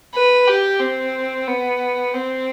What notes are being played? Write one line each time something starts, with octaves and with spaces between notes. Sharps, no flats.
B4
G4
C4
B3
C4